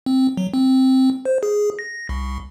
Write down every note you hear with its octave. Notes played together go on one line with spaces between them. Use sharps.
C4
F#3
C4
C5
G#4
A#6
C2